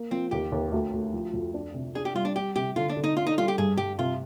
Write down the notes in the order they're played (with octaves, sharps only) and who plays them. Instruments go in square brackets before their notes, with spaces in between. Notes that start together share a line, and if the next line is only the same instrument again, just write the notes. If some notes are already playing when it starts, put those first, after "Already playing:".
Already playing: [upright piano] A#3
[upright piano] F3 [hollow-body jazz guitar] C4
[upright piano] D#2 [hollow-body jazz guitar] G4
[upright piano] D#2
D2
D2
F3
F2
D4
C3
[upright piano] D4 [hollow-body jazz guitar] G#4
[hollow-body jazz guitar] G4
[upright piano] G3 [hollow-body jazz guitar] F4
[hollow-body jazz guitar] D4
[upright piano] G3 [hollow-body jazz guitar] G4
[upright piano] C3 [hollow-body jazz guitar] G4
[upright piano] D3 [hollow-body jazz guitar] F4
[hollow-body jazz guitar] D4
[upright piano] D3
[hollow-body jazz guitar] D#4
[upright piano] D4 [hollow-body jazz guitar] F4
[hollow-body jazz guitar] D#4
[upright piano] G3 [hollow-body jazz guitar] F4
[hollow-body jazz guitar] G4
[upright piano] G2 [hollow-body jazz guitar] G#4
[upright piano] G2 [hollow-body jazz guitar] G4
[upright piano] C3 [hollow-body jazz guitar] F4